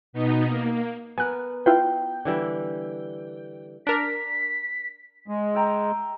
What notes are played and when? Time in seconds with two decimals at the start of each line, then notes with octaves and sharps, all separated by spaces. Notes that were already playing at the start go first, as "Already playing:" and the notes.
0.13 B2 B3 D#4
0.46 A#3
1.18 B3 A#4 G#5 F#6
1.66 E4 F4 B4 G5
2.25 D3 E3 G3
3.87 D4 A#4 B6
5.28 G#3
5.55 E5 G5 A#5